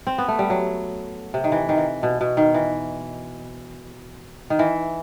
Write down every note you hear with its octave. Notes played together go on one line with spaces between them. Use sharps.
C4
B3
A3
G3
F#3
C3
D#3
E3
D#3
E3
B2
B2
D#3
E3
D#3
E3